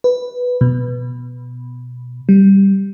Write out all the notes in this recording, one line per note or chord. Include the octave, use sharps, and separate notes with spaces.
B4
B2
G3